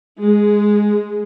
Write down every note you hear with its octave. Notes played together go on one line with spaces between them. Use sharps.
G#3